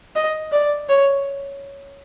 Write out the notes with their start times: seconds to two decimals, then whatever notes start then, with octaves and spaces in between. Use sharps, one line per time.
0.16 D#5
0.52 D5
0.89 C#5